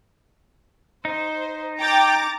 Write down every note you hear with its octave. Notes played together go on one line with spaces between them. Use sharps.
D#4 C5
G5 A#5 D6 A6